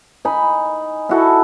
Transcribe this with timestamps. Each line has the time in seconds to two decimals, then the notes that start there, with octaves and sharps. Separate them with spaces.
0.25 D#4 G#5 B5
1.09 E4 F#4 A4